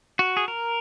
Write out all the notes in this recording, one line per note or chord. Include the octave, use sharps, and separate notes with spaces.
F#4
G#4
A#4